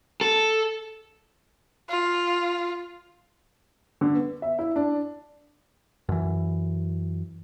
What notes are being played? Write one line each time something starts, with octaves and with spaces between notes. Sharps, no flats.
A4
F4
D3
B3
E5
E4
D4
F#2 E3